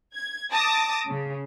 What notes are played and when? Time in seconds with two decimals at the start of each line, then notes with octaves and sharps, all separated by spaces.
0.14 G#6
0.53 A5 D6 D#6 A#6
1.06 C#3